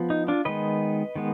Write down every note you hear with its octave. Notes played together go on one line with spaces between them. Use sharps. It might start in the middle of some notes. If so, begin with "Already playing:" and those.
Already playing: F3 B3
D#4
D4 F4
D#3 G#3 B3 B4 D#5
D#3 G#3 B3